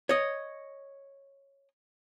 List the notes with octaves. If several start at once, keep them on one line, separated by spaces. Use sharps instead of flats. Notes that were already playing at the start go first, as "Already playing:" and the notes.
C#5 D#5